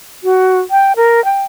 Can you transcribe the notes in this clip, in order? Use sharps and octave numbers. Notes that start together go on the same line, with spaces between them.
F#4
G5
A#4
G5